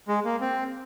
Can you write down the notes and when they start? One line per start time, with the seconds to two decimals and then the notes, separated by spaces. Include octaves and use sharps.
0.08 G#3
0.25 A#3
0.41 C4